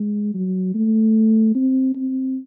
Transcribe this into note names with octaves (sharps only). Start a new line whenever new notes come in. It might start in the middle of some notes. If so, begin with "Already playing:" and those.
Already playing: G#3
F#3
A3
C4
C4